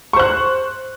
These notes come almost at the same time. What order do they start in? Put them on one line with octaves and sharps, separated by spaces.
C#6 C5 F#6